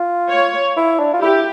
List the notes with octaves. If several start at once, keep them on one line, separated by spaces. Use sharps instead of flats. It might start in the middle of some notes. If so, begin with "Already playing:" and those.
Already playing: F4
C#5
E4
D4
F4
E4 G4